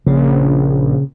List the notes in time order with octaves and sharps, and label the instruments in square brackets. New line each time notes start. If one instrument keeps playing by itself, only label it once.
[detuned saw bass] A#1 [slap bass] C#3